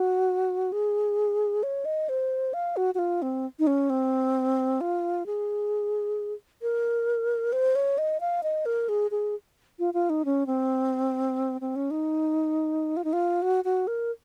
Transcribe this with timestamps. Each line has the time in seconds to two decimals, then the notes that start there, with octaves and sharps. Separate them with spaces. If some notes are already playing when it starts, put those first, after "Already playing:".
Already playing: F#4
0.72 G#4
1.63 C#5
1.85 D#5
2.09 C5
2.54 F5
2.77 F#4
2.95 F#4
2.99 F4
3.22 C4
3.59 D#4
3.67 C#4
3.90 C4
4.81 F4
5.26 G#4
6.62 A#4
7.53 C5
7.75 C#5
7.98 D#5
8.21 F5
8.43 D#5
8.66 A#4
8.89 G#4
9.11 G#4
9.79 F4
9.94 F4
10.10 D#4
10.25 C#4
10.47 C4
11.61 C4
11.76 C#4
11.91 D#4
12.97 F4
13.04 D#4
13.13 F4
13.42 F#4
13.64 F#4
13.87 A#4